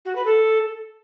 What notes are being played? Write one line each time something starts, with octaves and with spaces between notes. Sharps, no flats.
F#4
B4
A4